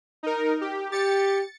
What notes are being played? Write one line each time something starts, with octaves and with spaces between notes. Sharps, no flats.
D#4 A#4
G4
G4 A6 C#7